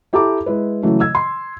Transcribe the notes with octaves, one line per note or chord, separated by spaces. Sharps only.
E4 G4 A4 A5 A#5 D6
G#3 E4 B4
C#3 E3 F#3 A3
E6 G#6
C6